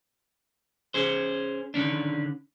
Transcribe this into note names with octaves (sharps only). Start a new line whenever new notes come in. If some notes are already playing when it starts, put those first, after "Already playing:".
C#4 G#4 C5
D3 D#3 C#4 D4